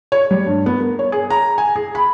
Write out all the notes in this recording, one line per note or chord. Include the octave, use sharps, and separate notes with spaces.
C#5
G3
G2
B3
A#4
C#5
G#4
A#5
G#5
G#4
B5